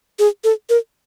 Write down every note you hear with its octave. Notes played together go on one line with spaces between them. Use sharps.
G#4
A4
A#4